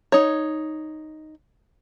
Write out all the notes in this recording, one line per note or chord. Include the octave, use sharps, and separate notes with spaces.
D#4 C#5